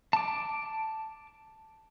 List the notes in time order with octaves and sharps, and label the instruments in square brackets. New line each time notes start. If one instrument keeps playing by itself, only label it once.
[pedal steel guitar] A5 D6